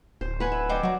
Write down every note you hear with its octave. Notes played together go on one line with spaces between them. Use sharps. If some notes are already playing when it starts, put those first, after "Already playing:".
D1 C5
B4 F#5 G#5
E5
D#4 C5 D5 G5 D6
F#3 F#4 A#5